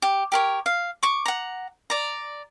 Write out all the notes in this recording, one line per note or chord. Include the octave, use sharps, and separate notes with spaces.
G4
G4 A#4 C#5
F5
C#6 D6
F#5 A#5
D5 A#5